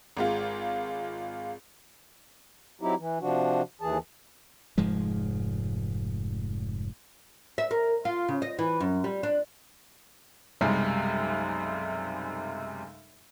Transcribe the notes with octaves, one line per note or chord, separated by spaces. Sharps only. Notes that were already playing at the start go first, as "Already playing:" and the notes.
G#1 G#3 F4
F#3 C4 D#4 E4 G4
E3
C3 F3 D4 F#4
D#2 E3 G#4 A5
F1 G#2 F3 G#3
E5
A#4
F4
C#3
D#5
E3
F#2
G3
D4
B1 F#2 C3 G3 G#3